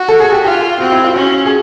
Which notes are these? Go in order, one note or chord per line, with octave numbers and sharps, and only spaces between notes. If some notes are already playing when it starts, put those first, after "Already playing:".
Already playing: F#4
A4
G#4
G4
F4 G4
C4 F#4
E4
F4
C#4 F#4
G#4